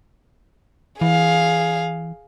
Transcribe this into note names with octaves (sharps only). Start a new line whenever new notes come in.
E3 G#4 F5